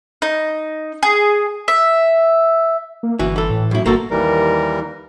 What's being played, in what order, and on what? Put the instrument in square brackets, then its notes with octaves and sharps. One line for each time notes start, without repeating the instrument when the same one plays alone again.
[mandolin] D#4
G#4
E5
[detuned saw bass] A#3
[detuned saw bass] G1 [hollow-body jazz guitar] E3 F#4
[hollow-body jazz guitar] E3 A4
[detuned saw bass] A2
[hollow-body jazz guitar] F#2 E4
[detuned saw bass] G1 [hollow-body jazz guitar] A#3 F#4 A4
[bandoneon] D#2 E3 G3 A#4